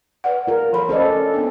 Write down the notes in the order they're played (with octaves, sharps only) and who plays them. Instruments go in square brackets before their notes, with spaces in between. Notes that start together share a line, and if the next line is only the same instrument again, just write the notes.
[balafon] B4 D5 F#5
[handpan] F4 A#4
[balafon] F3 A4 B5
[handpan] C#4 A4 D5 [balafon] C5 D#5
[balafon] B3 D4